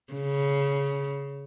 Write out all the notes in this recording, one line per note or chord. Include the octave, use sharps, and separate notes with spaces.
C#3